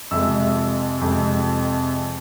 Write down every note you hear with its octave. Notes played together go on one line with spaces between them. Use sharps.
F2 C3 G#3 E5 E6
F2 C3 G#3